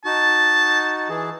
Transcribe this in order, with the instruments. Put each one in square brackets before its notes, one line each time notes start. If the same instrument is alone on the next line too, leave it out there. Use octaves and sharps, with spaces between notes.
[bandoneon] D#4 F#4 [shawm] A5
[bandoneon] E3 G#4